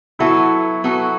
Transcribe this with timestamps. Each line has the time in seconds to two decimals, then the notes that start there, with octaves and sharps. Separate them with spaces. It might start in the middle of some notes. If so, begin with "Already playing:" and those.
0.19 F#3 B3 E4 F#4 A4
0.84 F#3 B3 F#4 A4